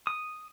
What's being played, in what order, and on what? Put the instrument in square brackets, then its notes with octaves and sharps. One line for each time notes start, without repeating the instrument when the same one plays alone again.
[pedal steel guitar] D#6